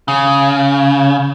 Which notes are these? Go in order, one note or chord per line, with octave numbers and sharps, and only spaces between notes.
C#3